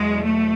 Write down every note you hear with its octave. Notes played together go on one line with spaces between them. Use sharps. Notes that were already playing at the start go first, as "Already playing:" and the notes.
Already playing: E2 B2 F#3 G#3
A3